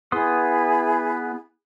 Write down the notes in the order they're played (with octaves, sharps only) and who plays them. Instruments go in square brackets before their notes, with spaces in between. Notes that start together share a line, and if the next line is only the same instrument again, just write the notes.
[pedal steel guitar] B3 C6 D#6 [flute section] E4 G#4